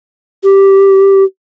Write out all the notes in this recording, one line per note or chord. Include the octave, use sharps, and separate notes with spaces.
G4